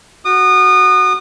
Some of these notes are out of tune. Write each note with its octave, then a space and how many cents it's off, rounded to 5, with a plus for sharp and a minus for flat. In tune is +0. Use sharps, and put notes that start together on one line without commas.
F#4 +0 D#6 -30